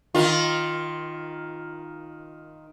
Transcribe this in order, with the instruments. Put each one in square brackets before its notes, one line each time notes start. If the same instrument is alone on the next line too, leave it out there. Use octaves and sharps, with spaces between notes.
[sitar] D#3 F4